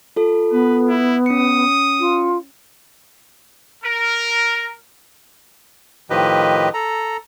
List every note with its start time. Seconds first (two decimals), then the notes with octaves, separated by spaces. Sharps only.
0.16 F4 A4
0.52 B3 B4
0.89 E4
1.26 C#4 D#6 C#7
2.00 F4
3.83 A#4
6.10 A2 D#3 F3 G4 B4 D#5
6.74 A4 A#5